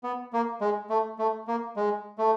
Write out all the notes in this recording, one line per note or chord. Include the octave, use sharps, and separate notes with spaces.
B3
A#3
G#3
A3
A3
A#3
G#3
A3